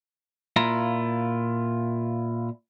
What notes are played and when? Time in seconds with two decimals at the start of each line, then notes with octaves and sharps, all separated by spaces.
0.56 A#2 E4 F4 A#5